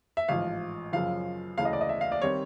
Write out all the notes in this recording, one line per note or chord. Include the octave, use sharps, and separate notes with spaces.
E5
A1 G#2 F3 F5
F#2 C#3 F3 F5
D2 C#3 E3 F5
D#5
D5
D#5
E5
F5
D5
D#3 G3 C4 C#5